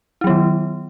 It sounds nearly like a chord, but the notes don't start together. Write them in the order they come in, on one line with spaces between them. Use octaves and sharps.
E4 F#3 B3 D#3